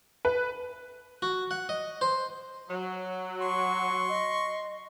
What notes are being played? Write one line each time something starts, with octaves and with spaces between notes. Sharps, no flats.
B4
F#4
F#5
D#5
C5
F#3
C6 C#6
D#5